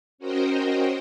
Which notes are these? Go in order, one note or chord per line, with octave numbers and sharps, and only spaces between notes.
C#4 F#4 A#4 C5 D#5 G5